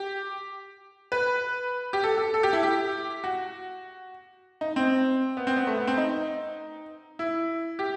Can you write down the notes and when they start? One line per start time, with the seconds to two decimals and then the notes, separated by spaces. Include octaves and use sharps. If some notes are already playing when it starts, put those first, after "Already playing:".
Already playing: G4
1.12 B4
1.93 G4
2.04 A4
2.18 A4
2.34 A4
2.43 G4
2.53 E4
2.63 G4
3.24 F#4
4.61 D#4
4.76 C4
5.37 B3
5.47 C4
5.56 B3
5.67 A3
5.78 B3
5.87 C4
5.97 D#4
7.19 E4
7.79 G4